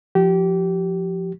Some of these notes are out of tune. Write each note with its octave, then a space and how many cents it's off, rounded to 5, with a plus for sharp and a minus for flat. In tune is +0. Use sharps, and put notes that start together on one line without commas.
F3 +0 G4 -25